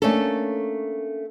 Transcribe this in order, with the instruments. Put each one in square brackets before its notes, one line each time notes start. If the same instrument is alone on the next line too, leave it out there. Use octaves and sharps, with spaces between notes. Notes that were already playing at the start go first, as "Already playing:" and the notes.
[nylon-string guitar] A3 A#3 C#4 D4 A4